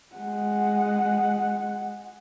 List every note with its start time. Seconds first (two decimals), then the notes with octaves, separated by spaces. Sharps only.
0.15 G#3 F#5